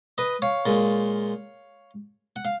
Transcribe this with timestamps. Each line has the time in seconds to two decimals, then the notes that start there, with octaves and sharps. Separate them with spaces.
0.18 B4 D#5
0.42 C#5 F5
0.66 A#2 G#3
2.36 F#5
2.45 F5